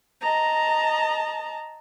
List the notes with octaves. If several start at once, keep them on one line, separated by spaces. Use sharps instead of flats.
D#5 A5 A#5